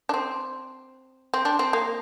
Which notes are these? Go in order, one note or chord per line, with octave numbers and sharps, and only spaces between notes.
D4
C4
C4
D4
C4
A#3